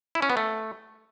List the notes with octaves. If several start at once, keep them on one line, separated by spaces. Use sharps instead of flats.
E4
C#4
B3
A3